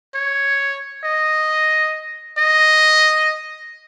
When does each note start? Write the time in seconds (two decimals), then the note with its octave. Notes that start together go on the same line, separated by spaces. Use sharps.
0.15 C#5
1.04 D#5
2.38 D#5